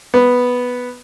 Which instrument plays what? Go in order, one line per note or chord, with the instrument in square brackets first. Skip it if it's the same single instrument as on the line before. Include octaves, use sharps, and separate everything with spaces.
[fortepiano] B3